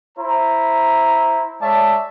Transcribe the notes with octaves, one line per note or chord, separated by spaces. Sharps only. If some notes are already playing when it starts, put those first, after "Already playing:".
E4 C5 A#5
G#3 C#5 D5 E5 A5